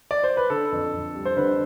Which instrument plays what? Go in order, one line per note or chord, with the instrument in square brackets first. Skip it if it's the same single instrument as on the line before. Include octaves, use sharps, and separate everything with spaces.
[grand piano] D5
C5
B4
D3 A4
F2
F2
G3
C5
D3 B4